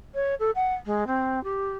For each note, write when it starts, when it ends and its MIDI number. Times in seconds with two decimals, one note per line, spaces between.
0.14 0.35 73
0.40 0.51 69
0.55 0.74 78
0.85 1.04 56
1.07 1.42 60
1.44 1.77 67